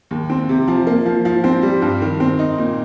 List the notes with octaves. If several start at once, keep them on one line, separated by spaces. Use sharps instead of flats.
D#2
C4
C3
F3
A#3
F3
F3
C4
G3
G2
D#3
C4
D#4
A#2